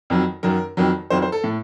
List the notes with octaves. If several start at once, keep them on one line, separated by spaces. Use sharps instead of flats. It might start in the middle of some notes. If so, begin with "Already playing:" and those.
F2 D#3 F#3
F#2 D#3 F#3 A#4
F2 D#3 F#3
F2 D#3 F#3 C5
C5
A4
A2